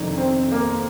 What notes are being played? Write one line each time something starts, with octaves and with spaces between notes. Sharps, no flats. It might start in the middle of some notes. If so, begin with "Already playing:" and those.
Already playing: F2 C3 D#3 D4
C4
A#3